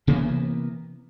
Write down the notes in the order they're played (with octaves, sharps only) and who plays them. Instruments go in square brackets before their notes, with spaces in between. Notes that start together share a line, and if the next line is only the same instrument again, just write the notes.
[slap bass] C3 E3 A#3 B3